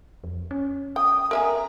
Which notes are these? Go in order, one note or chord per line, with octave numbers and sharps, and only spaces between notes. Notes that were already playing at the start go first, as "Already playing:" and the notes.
F2
C#4
G5 D#6
A#4 E5 G#5 A#5